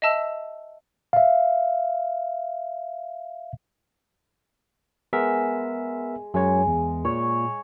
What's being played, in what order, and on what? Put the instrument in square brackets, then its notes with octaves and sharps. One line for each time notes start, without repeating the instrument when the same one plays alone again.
[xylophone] D#5 E5 A5 E6
[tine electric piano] E5 F5
[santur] G#3 [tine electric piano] B3 A#4 E5
[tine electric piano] F#2 F#3 C#5 [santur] G#3
[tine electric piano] E2
[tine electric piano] A#2 [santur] C#5